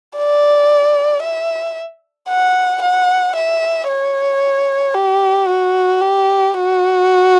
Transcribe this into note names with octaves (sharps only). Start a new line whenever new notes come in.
D5
E5
F#5
F#5
E5
C#5
G4
F#4
G4
F#4